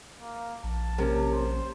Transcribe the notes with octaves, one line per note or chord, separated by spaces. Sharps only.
A#3
A#1 A5
C3 A#3 C#4
C5